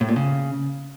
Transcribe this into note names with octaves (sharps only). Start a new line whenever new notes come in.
A2
A#2
C#3